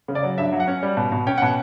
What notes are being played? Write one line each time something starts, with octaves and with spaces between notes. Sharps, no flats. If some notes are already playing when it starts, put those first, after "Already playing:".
C#3
D5
F#3
G2 E5
F#3
F#5
C#4
G3
B2
B2
C#4 G5
B2 F#5